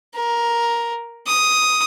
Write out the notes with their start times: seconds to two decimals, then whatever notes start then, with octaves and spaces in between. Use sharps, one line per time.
0.15 A#4
1.27 D#6